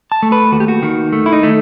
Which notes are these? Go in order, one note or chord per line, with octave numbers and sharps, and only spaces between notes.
A5
A3
B4
D#2 F#4
G4
F#4
D#3
A3
E4
D#4
A3